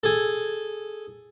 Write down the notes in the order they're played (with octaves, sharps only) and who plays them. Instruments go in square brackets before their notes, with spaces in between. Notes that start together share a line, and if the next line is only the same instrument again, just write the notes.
[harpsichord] G#4 A4